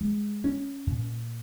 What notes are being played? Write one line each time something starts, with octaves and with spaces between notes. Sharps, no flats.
G#3
C#4
A#2